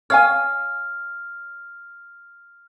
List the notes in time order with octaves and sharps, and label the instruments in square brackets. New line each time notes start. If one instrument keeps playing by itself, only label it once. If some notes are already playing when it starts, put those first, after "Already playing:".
[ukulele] C#5 F5 G#5 [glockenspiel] F6